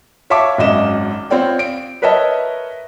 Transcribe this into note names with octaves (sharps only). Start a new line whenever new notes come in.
C#5 E5 F5 A5 C#6 D6
G#1 F#2 D#5 E7
C4 F4 C#5 D5 G5
D7
A#4 B4 C#5 D#5 E5 A5